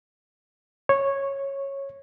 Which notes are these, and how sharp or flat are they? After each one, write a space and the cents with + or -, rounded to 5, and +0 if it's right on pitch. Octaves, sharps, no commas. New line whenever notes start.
C#5 -10